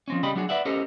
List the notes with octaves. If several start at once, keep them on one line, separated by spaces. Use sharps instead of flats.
F3 C4 C#4
C#3 G3 C#4 G4 D#5 B5
F#3 D4 F#4 G#4
B4 D5 E5 F#5
C#4 G4 A4 A#4 C5 D#5